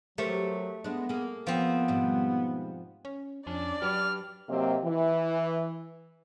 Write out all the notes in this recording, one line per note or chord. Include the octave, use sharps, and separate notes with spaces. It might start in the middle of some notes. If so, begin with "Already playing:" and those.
F#3 A3 G4 A#4 C5
G#3 B3 D4
A#3 G#4
F3 B3 C4
G#2 B2 G3
C#4
F2 C#4 D4 D5
F#3 G4 B4 F6
C3 F#3 A#3 C4 G4 D#5
E3